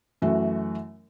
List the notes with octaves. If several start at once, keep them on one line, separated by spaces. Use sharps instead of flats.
F#2 E3 A3 F#4